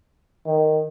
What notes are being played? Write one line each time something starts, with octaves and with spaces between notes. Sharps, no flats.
D#3